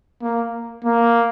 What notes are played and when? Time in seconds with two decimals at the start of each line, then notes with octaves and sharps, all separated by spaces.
0.22 A#3
0.85 A#3